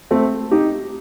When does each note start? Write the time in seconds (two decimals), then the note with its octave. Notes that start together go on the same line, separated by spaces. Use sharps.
0.11 A3 C4
0.51 D#4 G4